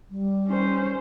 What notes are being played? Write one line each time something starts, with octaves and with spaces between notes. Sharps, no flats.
G3
C#4 C5